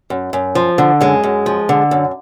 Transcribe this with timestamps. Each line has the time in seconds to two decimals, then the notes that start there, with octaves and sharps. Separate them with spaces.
0.10 F#2
0.33 F#2
0.55 F3
0.78 D3
1.01 F#2 G#3
1.23 F#2
1.46 F3
1.69 D3
1.91 F#2